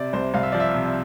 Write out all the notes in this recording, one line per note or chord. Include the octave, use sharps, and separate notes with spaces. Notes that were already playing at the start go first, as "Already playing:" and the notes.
Already playing: C3 D5
C2 C5
C2 F5
E5
F3 D5
E5
C3